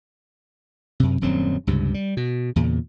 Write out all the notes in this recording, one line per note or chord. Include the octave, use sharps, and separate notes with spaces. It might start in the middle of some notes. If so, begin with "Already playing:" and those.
F#2 C3
D#1 F#2 F#3 C4
C#2 G2 C3
G3
B2
E2 A#2 C#3